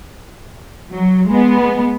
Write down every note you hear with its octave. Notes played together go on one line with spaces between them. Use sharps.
F#3
G#3 B3